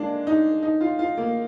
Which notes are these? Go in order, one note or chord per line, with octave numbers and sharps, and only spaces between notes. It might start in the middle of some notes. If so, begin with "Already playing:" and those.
Already playing: G#3 A#3 D4
D#4
D#4
F4
F4
A#3